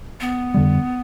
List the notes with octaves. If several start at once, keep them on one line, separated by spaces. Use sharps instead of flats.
B3
F2 D3 G3